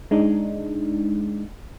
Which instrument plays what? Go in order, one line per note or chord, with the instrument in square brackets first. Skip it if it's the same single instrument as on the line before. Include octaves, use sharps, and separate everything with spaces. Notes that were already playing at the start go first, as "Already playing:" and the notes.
[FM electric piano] G#3 D4 D#4